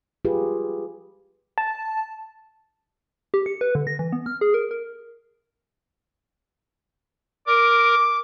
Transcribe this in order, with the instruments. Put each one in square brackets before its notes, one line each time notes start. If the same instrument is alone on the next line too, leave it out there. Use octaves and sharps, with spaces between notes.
[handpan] F4 G4 G#4 B4
[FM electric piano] A5
[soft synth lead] G4
C#7
B4
D3
A#6
E3
B3
F6
G#4
A#4
A#4
[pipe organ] A#4 [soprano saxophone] D6